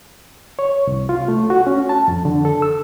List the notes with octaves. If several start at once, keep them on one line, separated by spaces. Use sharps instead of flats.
C#5
C2
F4
A3
F#4
C#4
A5
F2
D3
A4
E6